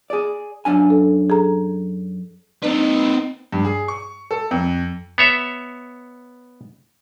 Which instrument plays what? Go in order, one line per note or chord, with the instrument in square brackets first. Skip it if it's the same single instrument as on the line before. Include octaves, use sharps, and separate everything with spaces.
[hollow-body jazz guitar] G#4 D5
F#2 D4 G#5
[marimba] A4
G#4 A4 A#5
[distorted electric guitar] C4 B4 [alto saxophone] D#4
[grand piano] G2
G#4
C#6
A4
F2
[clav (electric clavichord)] B3 C#5 E5